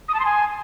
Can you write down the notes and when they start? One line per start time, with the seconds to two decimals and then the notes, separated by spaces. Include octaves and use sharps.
0.09 D#6
0.14 A5
0.20 C6
0.25 G#5